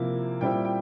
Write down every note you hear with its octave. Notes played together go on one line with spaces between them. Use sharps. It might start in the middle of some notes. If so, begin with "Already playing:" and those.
Already playing: C3 F3 A#3 E4
A#2 G3 C4 E4 G5
G5